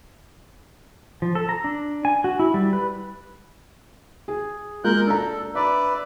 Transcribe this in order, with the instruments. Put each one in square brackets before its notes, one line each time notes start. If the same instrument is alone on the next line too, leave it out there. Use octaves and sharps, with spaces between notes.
[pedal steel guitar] F3
A4
A#5
D4
G#5
F#4
E4
G3
B4
[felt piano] G#4
[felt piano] G#3 A#3 F4 [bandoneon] A#4 F#6 G6
[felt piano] D4 A#5 [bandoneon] A4
[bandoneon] B4 D5 E5 [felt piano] D6